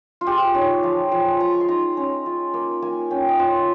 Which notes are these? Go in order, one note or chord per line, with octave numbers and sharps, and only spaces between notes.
F4
G#3 G4
D#4 C#5
F3 F5
F3 G#5
G#3 A#5
C#6
C6
D#4 A#5
C#4
F4
A#3
A#3 G#5
C#4 G5
D#5
F4 F5